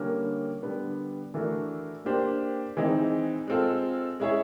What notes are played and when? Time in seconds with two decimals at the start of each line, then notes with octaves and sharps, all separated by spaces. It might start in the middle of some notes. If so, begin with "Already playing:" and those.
Already playing: D3 G3 A#3 C#4
0.62 D3 G3 B3
1.34 E3 A3 D4 F#4 A#4
2.05 A#3 D4 G4 C5
2.77 E3 G#3 C4 D#4
3.48 G#3 C4 F4 A4
4.20 G#3 C#4 E4 G#4 C#5